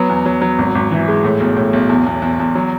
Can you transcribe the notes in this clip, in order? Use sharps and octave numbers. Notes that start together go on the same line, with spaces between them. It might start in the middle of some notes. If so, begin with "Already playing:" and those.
Already playing: F#3 B3
E2
F#3
F#3
G#1
G#1
E3
G#3
A2
B1
A2
B1
E2
E2
E2
E2
F#3